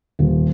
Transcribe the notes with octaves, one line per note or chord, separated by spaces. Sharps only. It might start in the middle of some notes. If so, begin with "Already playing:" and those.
D#1